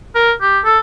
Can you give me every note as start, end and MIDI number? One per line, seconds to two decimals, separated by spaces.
0.15 0.32 70
0.41 0.60 67
0.65 0.79 69